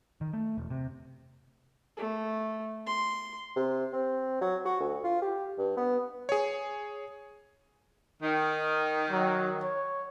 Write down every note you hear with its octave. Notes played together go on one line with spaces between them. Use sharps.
D#3
A3
E1
C3
A3
C6
C3
C4
F#3
F#4
D2
F4
G4
G2
B3
G#4 C#5
D#3
F#3
C#5